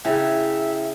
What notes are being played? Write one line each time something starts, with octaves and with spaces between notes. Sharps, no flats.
C#3 E4 E5 G5